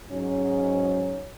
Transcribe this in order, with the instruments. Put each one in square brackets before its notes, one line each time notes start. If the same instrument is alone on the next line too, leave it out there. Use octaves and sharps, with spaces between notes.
[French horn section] G#2 F#3 C#4